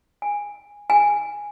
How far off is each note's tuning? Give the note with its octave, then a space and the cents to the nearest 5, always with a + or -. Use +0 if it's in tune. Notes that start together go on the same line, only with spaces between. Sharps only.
G#5 -15
G#5 -10